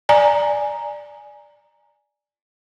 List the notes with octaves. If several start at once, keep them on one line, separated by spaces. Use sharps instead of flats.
D5 G#5 A#5